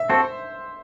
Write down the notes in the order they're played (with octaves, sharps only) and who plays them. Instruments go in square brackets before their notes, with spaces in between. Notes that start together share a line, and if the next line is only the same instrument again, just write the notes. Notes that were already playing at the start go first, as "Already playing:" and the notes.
Already playing: [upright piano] E5
[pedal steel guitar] C4 F#4 A4 [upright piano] C5